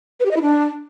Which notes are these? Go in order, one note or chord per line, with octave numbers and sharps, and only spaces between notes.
B4
G4
D#5
E4
D4